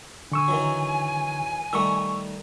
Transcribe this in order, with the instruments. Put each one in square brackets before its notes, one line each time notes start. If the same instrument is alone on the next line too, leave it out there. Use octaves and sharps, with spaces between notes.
[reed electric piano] D3 C#6 E6 [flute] G#5
[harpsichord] D#3 E3 F#3
[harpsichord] D#3 G3 A3 [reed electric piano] C#6 E6